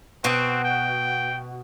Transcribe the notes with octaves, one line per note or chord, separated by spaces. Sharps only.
B2 C4 F#4
G5